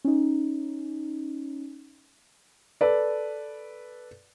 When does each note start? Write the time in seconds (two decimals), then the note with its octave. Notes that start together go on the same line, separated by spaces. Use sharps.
0.05 C#4 D#4
2.81 A4 B4 D5